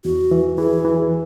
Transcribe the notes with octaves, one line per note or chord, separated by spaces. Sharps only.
E2 F#4
E3
E3 G#4
E3